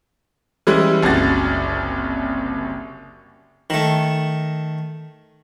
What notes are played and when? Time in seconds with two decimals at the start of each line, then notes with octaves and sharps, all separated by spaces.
0.67 E3 G3 G#3 C#4 E4
1.03 F#1 C2 C#3 F#4 A6
3.70 D#3 A3